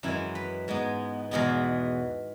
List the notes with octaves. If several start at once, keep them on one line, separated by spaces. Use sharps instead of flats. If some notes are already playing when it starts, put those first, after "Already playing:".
F#2 E3 G#3 E4
B4
G#2 G#3 B3
E2 B2 G#3 B3